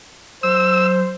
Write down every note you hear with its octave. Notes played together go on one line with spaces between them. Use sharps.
F#3 C5 E6